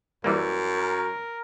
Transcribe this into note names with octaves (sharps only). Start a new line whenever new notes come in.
F#2 E3 G3 A#3
A#4